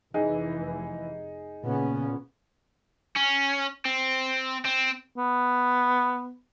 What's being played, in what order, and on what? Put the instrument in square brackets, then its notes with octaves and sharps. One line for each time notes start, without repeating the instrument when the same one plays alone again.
[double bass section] F1 [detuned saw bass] E3 [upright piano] D#4 G#4
[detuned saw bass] A#2 [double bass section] C#3 B3 C#4
[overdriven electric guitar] C#4
C4
C4
[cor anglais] B3